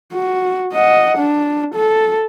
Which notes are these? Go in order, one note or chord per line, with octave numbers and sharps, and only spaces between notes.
F#4
D#5 F#5
D4
A4